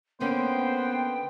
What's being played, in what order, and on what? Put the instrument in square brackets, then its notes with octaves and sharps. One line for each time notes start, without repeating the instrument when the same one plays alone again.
[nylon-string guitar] D3 A#3 C#4 [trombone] B3 [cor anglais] C5 [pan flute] G5